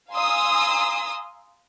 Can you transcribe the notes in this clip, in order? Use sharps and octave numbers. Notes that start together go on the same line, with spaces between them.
F5 G#5 A#5 C6 D#6 E6